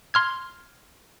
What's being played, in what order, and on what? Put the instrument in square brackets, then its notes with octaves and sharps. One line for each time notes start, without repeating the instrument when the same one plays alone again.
[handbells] C6 F6 G#6